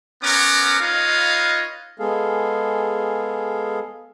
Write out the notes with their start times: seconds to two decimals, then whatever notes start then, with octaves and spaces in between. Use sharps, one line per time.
0.23 B3 C#4 A#4 F#5 A#5 D6
0.80 D#4 F4 B4 C#5 D#5 F5
1.99 G#3 B3 G#4 A4 F5